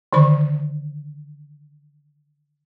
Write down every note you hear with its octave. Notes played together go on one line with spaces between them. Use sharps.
D3 D#3 F3 B5